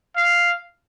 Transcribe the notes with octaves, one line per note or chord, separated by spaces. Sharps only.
F5